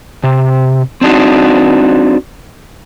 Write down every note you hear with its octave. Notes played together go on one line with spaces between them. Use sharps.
C3
C4 D4 D#4 F#4